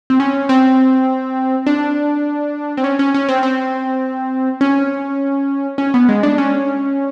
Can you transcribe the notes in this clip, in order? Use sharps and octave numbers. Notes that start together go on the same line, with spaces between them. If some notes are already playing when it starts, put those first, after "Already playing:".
C4
C#4
C4
D4
C4
C#4
C#4
C#4
C4
C4
C#4
C#4
B3
G#3
D4
C#4